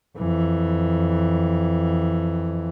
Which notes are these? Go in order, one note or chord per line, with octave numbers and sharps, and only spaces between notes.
F2 E3